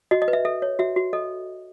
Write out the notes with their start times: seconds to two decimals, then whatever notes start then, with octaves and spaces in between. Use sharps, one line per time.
0.11 F#4 D#5
0.22 D#5
0.28 B4
0.33 E5
0.45 A4 E5
0.62 C#5
0.79 F#4 E5
0.96 F#4
1.13 A4 D#5